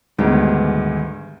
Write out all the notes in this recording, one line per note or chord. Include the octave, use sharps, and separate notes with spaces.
D2 G#2 D#3 G3 B3